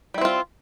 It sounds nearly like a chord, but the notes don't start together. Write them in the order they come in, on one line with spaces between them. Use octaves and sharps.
G3 E4 C4 F4